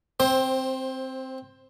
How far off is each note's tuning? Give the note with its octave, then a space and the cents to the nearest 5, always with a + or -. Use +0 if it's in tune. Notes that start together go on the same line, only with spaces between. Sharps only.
C4 +0 C5 +20